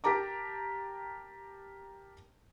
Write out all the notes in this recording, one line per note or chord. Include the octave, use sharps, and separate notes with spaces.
G4 A#4 A5 A#5 D6